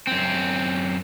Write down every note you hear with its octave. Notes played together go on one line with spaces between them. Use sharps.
F#2 C4